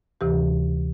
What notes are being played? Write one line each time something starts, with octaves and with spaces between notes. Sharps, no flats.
D2 C3 E3 G4